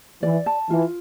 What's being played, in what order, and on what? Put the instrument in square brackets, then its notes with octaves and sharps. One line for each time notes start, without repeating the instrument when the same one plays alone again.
[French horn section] E3 [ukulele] D5
[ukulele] A5
[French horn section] E3 [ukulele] F4